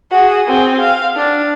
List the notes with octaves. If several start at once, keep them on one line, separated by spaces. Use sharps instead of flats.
F#4 G#4
C4 G#4
F5
D4